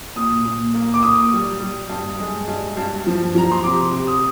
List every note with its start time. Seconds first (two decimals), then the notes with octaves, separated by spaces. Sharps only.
0.16 A#2 D#6
0.45 A#2
0.74 A#3
0.94 D6
1.03 A#2 D#6
1.32 G3
1.61 G3
1.90 G2
2.20 G#3
2.47 G2
2.77 G2
3.07 F3
3.35 F3 A#5
3.52 C6
3.64 C3 D6
3.92 C3
4.07 D#6